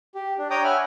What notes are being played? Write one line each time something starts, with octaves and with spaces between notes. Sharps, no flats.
G4
D4
C#5 G5 A#5 D6 D#6
E5 F#5 G#5 B5 F6